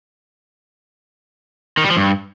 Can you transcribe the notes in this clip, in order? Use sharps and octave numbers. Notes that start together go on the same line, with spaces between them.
D#3
G3
F3
G2